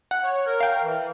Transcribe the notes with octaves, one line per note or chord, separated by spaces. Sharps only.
F#5
C#5
A#4
F5 G5
E3